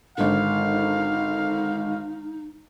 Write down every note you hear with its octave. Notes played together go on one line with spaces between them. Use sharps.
G#1 D3 D#4 F5